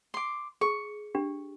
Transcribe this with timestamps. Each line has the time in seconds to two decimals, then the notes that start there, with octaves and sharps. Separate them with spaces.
0.14 C6 D6
0.61 G#4 C#6
1.15 D4 G4